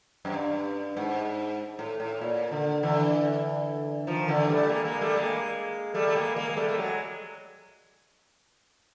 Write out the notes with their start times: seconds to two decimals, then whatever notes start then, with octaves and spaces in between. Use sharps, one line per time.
0.25 F#2
0.34 G2
0.96 G#2
1.79 A2
2.00 A2
2.21 A#2
2.52 D3
2.83 D3 E3
4.07 D#3 F3
4.28 D3 E3
4.49 G3 A3
4.69 G#3 A#3
4.85 G#3 A#3
5.01 G3 A3
5.16 G#3 A#3
5.94 G3 A3
6.08 A3
6.15 G#3 A#3
6.36 G#3 A#3
6.50 A#3
6.57 G3 A3
6.68 A3
6.78 F#3 G#3